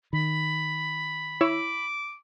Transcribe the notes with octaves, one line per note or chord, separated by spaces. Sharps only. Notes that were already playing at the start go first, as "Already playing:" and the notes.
D#3 B5
E4 C#5 D6 E6